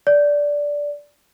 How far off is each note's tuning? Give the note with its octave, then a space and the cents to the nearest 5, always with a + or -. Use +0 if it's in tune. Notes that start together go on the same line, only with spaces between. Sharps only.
D5 -10